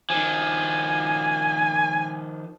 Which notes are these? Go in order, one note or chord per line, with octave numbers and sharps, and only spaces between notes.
D#3 F3 G#5